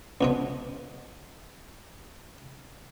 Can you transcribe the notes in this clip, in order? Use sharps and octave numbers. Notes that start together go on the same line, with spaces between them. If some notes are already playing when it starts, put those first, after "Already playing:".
C#2 B2 F3